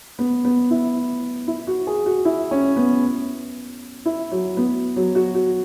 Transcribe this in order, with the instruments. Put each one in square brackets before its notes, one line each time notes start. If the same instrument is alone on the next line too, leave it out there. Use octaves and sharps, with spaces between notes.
[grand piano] B3
B3
E4
E4
F#4
G#4
F#4
E4
C#4
B3
E4
F#3
B3
F#3
F#4
F#4